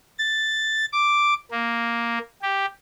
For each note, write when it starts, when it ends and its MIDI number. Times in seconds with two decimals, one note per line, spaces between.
0.18 0.85 93
0.93 1.34 86
1.51 2.19 58
2.42 2.66 67